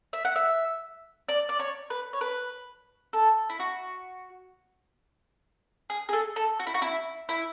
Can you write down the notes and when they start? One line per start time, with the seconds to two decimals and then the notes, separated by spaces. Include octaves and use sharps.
0.13 E5
0.25 F#5
0.36 E5
1.29 D5
1.49 D5
1.59 C#5
1.90 B4
2.13 C#5
2.21 B4
3.13 A4
3.50 E4
3.60 F#4
5.90 G#4
6.09 G#4
6.13 A4
6.36 A4
6.59 F#4
6.67 E4
6.74 F#4
6.82 E4
7.29 E4